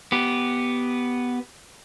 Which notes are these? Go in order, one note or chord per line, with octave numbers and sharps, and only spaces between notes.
B3 G4